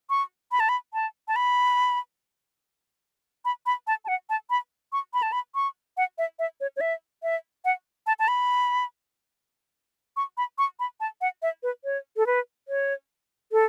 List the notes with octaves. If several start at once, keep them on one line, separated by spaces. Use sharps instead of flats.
C#6
B5
A5
B5
A5
A5
B5
B5
B5
A5
A5
F#5
A5
B5
C#6
B5
A5
B5
C#6
F#5
E5
E5
C#5
C#5
E5
E5
F#5
A5
A5
B5
C#6
B5
C#6
B5
A5
F#5
E5
B4
C#5
A4
B4
C#5
A4